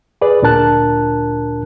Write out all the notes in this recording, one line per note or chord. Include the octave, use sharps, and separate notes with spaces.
G#4 B4 D5
D2 A#2 D4 A#4 A5 F#6